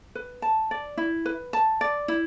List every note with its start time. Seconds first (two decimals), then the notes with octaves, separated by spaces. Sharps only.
0.15 B4
0.42 A5
0.71 D5
0.97 E4
1.26 B4
1.53 A5
1.81 D5
2.08 E4